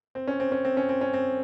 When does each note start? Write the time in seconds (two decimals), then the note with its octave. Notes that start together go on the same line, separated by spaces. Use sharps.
0.15 C4
0.27 C#4
0.40 C4
0.52 C#4
0.65 C4
0.77 C#4
0.89 C4
1.01 C#4
1.14 C4